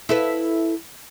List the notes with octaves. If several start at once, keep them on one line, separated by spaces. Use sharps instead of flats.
E4 A4 B4